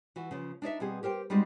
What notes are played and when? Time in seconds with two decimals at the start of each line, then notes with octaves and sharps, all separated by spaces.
0.16 E3 F#4
0.31 C#3 F3
0.62 D4 D#4 D5 E5
0.80 B2 G3 C4 G#4
1.03 G4 A#4 C5 G5
1.30 G3 G#3 C4 D#4 F#4 G#4